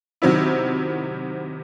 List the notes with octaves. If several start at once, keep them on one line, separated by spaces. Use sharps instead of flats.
C3 D#3 F#3 C4 E4